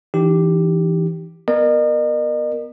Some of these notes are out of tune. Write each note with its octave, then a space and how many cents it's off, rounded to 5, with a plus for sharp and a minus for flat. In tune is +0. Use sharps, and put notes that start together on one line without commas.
E3 +0 D#4 -30 G4 +0
B3 -10 A#4 +0 D#5 -40